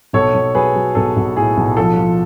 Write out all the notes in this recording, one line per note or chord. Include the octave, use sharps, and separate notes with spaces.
B1 A4 C#5
B1
F#3 G#4 B4
F#3
B1 A4
B1
A2 G#4
B1
F3 A4
F3